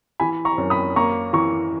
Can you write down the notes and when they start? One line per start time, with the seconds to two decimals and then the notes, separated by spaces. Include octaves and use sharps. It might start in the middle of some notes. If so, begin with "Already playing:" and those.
0.20 E3 G#5 B5
0.45 A#5 C#6
0.58 F#2
0.70 B5 D#6
0.96 A#3 A#5 C#6
1.33 E3 A#5 C#6